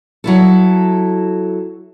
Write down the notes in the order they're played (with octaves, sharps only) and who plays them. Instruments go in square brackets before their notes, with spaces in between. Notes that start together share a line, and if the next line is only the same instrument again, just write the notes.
[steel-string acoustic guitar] F#3 E4 A4